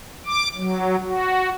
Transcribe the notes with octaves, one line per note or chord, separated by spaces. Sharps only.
D6
F#3
F#4